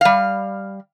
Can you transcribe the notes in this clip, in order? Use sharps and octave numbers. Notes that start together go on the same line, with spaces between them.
G3 F5